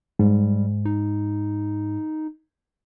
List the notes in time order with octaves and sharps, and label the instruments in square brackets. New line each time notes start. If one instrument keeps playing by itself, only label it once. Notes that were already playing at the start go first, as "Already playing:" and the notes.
[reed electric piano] G#2 [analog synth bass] G3
[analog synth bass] D#4